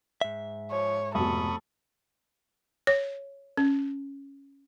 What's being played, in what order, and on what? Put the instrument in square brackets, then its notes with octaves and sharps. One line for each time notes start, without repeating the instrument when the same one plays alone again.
[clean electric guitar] G#2 E5
[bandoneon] F3 [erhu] C#5
[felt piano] F1 B2 [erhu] A4 [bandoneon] B5 C#6 D#6
[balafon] C#5
C#4